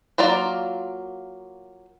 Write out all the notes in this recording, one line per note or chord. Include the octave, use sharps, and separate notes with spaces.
F#3 A#3 F4 D5